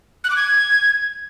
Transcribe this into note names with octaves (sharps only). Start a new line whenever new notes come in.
F#6
D6
G#6